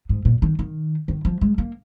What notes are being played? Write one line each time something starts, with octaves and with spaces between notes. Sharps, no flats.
G#2
A#2
D#3
D#3
D#3
F3
G#3
A#3